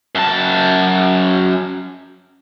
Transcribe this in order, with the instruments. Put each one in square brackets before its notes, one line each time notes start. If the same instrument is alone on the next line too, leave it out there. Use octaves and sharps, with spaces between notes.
[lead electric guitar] F#2 A5